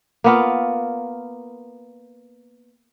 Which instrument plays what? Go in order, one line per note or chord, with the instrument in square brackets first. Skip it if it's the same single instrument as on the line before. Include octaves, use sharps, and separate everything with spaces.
[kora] A#3 B3 F4